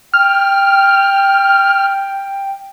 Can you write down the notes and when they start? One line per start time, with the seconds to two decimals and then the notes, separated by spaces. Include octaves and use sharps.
0.14 G5 F6